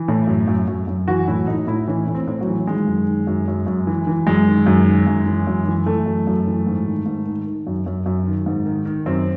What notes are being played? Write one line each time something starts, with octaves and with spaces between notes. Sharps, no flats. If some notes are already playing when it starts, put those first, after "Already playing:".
Already playing: E3
A2
F#2
F#2
F#2
F#2
E3 F#4
A2 E4
A2 D#4
A2 E4
E3 C#4
A2
C4
A2
F#3
E3
D#3 G#3
F#2
D#3
F#2
F#2
F#2
E3
E3
F#2 G#3
D#3
F#2
D#3
F#2
E3
F#2
E3
E3 A3
F#2
F#2
E3
G#2
D#3
G#2
D#3
D#3
F#2
F#2
F#2
D#3
G#2
D#3
D#3
F#2 C4